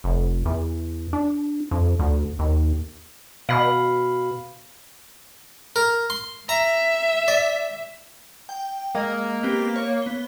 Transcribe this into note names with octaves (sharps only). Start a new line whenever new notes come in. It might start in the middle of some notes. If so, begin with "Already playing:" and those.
F1
E2
D4
F2
D2
D#2
B2 F5 B5
A#4
C6
E5 A#5
D5
G5
G#3 A#3 D#5
B3 C4 G4
C#5
B3 G7